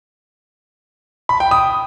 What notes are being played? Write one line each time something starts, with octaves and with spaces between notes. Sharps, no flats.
B5
G5
D#6